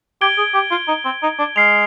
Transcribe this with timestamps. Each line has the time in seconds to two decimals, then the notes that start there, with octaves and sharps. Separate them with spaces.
0.21 G4 G#6 D7 G7
0.38 G#4
0.54 G4
0.71 F4
0.88 D#4
1.05 C4
1.23 D#4
1.39 D4
1.56 G#3 F6 C7 F7